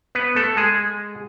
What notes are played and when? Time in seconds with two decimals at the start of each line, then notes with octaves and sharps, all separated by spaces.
0.15 B3 B4
0.36 A3 A4
0.57 G#3 G#4